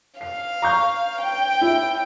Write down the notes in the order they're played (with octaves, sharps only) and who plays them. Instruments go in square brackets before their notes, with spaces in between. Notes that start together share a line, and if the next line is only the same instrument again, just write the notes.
[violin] F5 [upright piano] C7
[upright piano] A#5 C#6 G6
[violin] G5
[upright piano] E4